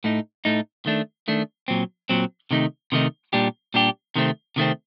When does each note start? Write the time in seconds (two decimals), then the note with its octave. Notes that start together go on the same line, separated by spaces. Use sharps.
0.04 A2 A3 D#4
0.45 A2 A3 D#4
0.86 D#3 A3 D4
1.28 D#3 A3 D4
1.68 A#2 F#3 C4
2.09 A#2 F#3 C4
2.51 C3 D#3 A3 D#4
2.92 C3 D#3 A3 D#4
3.33 A#2 G3 D4 G4
3.74 A#2 G3 D4 G4
4.16 C3 D#3 A3 C4
4.56 C3 D#3 A3 C4